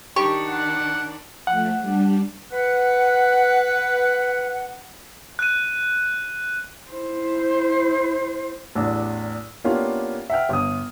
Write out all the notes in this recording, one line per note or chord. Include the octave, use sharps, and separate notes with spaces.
D#3 D4 G4 C#6
F#5
F3 A3 F#5
G3 D4
B4 F#5
F#6 D#7
E4 C5
A1 E2 D4
A#3 B3 C#4 D4 F4 G4
E5 F#5 G5 F6
G1 D#6